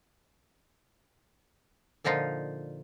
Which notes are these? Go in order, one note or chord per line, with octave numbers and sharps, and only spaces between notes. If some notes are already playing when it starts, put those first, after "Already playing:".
A#2 D3 F3 D#4 F4